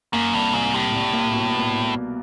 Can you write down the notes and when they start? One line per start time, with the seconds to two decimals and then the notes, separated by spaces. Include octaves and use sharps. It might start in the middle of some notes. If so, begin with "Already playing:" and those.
0.13 F#2 A#3
0.33 C2 G2
0.53 C2 G#2
0.73 A2 G3
0.94 C2
1.13 A#3
1.33 B2
1.54 B3